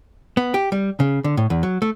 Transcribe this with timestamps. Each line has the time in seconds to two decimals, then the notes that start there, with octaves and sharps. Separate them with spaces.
0.37 B3
0.54 G4
0.72 G3
1.00 C#3
1.24 D3
1.37 A2
1.50 E2
1.63 F#3
1.82 A3